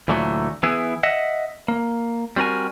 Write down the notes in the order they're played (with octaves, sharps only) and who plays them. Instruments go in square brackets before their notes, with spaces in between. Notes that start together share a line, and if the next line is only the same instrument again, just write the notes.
[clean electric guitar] D2 A#2 D3 E3 F#3 A3
E3 B3 E4 G#4
D#5 E5 F#5
A#3
G3 C4 F#4 A#4 G#5